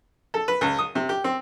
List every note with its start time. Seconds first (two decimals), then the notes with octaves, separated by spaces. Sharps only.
0.34 A4
0.48 B4
0.61 C#2
0.79 D#6
0.95 C3
1.09 G4
1.24 C4